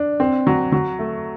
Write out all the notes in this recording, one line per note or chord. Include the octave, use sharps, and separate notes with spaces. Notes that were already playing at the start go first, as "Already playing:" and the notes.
Already playing: D4
C4
F#3
F#3
A3